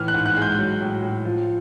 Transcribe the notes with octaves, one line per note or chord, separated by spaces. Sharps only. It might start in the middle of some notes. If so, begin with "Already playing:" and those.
Already playing: A2 E3 F6
F#6
G#2
F#6
G#3
G6
F#3
A2
A2
F3